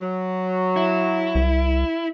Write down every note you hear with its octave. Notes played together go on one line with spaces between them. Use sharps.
F#3
E4
C2